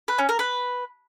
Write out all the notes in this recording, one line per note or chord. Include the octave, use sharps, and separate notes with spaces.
B4
C#4
A#4
B4